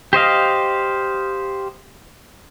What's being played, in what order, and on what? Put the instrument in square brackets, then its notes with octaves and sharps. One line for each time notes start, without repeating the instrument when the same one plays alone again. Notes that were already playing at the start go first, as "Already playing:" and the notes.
[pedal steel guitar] G4 C5 D#5 F5